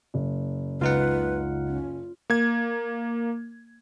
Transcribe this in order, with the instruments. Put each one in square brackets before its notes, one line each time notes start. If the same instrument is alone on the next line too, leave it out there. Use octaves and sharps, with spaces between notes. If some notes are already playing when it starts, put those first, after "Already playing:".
[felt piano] F#1
[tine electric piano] C#2 D#4 F#5 [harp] F4 [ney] B4
[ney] C#4
[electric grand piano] A#3 G#6